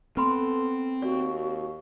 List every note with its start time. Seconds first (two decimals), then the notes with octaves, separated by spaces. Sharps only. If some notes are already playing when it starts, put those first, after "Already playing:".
0.17 B3 C4 A4 B4 B5 C6
1.02 D#2 F#4 D5